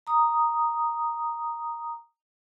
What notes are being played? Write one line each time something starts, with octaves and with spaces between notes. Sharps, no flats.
A#5 D#6